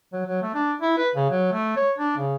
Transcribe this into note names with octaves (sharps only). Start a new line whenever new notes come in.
F#3
F#3
A3
D4
E4
B4
C#3
F#3
A3
C#5
D4
C#3